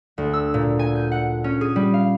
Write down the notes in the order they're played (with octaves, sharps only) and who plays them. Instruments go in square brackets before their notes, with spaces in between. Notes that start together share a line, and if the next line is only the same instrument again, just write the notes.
[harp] D2
E6
A#2
G#5
G6
F#5
C#4
G#4
G3
F5